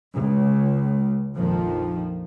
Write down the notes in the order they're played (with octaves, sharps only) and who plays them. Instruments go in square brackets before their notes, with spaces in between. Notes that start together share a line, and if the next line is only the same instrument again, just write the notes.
[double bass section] C#2
A#1 F2 D#3 F3